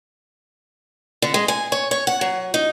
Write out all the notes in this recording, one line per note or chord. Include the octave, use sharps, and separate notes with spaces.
D3
G#3
G#5
C#5
C#5
F#5
F#3
D#4